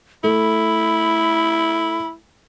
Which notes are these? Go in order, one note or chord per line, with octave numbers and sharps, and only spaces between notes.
A3 E4 B5